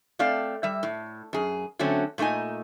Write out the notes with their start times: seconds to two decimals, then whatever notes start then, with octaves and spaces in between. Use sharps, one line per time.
0.19 A3 C4 D5 F5
0.63 G3 E5
0.83 A2
1.33 F#2 G#4
1.79 D3 F#3 A3 C4 C#4
2.18 A#2 A3 D#4 D#5 G#5